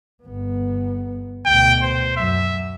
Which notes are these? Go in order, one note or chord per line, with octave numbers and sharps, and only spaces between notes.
G1 B3
D2 B2 G5
C5
F#2 F#3 E5